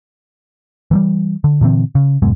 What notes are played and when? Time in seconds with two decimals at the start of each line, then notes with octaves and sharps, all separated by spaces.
0.91 E3 F#3 G3
1.44 D3
1.61 A#2 D3 E3 C4
1.95 C#3
2.22 D1 F#2 B2 G#3